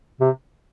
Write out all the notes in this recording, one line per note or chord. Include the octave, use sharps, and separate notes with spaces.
C3